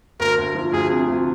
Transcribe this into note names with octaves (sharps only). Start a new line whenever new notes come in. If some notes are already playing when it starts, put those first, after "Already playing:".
D2 A#4
D2
F3
D2 G#4
C3
D2